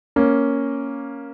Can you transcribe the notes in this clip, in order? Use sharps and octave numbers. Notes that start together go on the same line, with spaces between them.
A#3 C#4